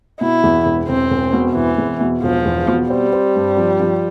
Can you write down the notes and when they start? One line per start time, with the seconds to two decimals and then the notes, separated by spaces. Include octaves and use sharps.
0.20 B2 E4
0.44 E2
0.66 E1
0.88 E1 C4
1.10 E1
1.33 B2
1.55 E1 E3
1.78 E2
2.01 B2
2.23 E1 F3
2.45 E2
2.68 B2
2.90 G3 C4
3.13 C4
3.35 G2
3.57 F3
3.80 F3